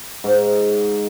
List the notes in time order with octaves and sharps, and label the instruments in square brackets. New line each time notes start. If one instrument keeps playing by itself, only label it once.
[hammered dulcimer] G#2